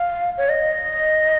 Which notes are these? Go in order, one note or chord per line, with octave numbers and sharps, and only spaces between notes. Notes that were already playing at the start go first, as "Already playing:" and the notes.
Already playing: F5
C#5
D#5